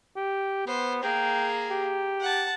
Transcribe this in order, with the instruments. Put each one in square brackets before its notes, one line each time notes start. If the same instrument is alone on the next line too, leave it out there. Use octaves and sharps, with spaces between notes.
[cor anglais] G4
[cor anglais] B3 [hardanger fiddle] C5
[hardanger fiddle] A#3 G#4 [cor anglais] G5
[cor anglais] G4
[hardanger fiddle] F#5 A5